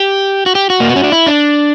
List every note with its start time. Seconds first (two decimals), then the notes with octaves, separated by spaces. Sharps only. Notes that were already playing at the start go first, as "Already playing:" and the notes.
Already playing: G4
0.46 F#4
0.55 G4
0.70 F#4
0.80 A#3
0.89 B3
0.96 C#4
1.04 D4
1.12 E4
1.27 D4